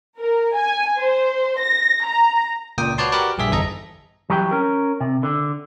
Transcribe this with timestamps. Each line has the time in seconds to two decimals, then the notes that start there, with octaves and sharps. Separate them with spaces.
0.18 A#4
0.55 G#5
1.00 C5
1.59 A#6
2.06 A#5
2.78 C#2 A#2 G5 D#6
2.98 F#4 B4 C#5 D5 A5 C6
3.12 F#4 G4 A#4 B4 D5
3.38 A#1 G2 G4 G#4 E5 B6
3.51 G1 E2 A4 D#5 A#5
4.30 E3 F#3 G4 G5
4.51 C#4 A#4
5.01 C3
5.23 D3